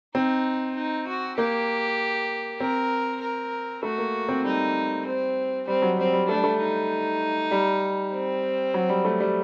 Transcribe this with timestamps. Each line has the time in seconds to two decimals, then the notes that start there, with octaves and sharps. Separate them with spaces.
0.15 C4 D#4
0.76 D#4
1.07 F#4
1.38 A#3 G4
2.60 C4 A#4
3.22 A#4
3.83 A3 F#4
3.98 A#3
4.29 C4
4.44 G3 D#4
5.06 C4
5.67 G3 C4
5.82 F#3
5.98 G3 C4
6.13 G3
6.28 A3 D4
6.36 G3
6.44 A3
6.60 D#4
7.51 G3
8.12 C4
8.74 F#3
8.89 G3
9.05 A3
9.20 G3